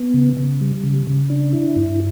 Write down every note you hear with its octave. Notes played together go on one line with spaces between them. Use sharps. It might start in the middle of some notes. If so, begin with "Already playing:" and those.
Already playing: B3
C#3
C#3
G3
C#3
C#3
D4
E4
G2